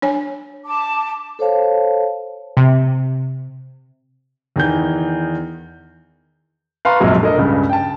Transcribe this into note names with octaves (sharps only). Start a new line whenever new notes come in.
D4 C#5 G#5
A5 D6
A4 C5 C#5 F5 A5
C3
E2 D#3 E3 G6
B4 F5 A5 A#5 C6 C#6
A#1 F#2 C3 F3 F#3 G#3
D4 A4 A#4 D#5
C#2 G2 C#3
G5 A5